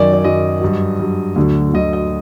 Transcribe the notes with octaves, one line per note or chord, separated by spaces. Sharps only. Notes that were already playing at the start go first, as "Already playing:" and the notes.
Already playing: F#2 D#3 F#3 D5
D5
F#2 D#3 F#3 D#5
G2 F#3
G2 F#3
D2 D3 F#3
D2 D3 F#3 D#5
D#5